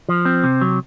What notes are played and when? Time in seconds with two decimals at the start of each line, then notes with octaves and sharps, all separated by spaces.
0.09 F3
0.25 C4
0.43 C3
0.61 F#3